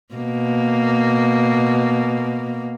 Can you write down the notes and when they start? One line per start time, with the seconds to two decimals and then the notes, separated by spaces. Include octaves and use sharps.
0.14 B2 A#3